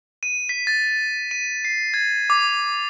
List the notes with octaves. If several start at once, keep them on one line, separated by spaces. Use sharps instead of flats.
D#7
B6
A6
D#7
C7
G#6
D6